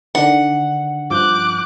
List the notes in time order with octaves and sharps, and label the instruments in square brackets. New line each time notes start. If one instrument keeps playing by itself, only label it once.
[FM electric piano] D3 D#3 D4 [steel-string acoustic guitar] F#5
[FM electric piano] G2 F3 G6 [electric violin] D6 F#6